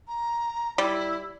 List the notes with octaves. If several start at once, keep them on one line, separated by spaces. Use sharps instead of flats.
A#5
G3 E4